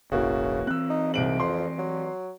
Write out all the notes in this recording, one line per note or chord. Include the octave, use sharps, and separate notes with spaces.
E1 A1 C#3 E3 A#3 F#4
E3 C4 E6 F#6
D#4
C2 G#2 D7 F#7
F2 C6
F#3